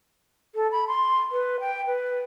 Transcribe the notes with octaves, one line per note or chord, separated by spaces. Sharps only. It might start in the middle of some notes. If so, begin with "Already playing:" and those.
A4
B5
C6
B4
G5
B4